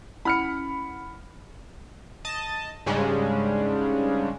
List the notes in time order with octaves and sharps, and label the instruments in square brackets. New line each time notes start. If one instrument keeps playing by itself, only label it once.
[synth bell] C#4 E4 F#5 [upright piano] B5 F6 C#7
[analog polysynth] D#5 A5 D#6
G#2 C#3 G3 G#3 C#4 D4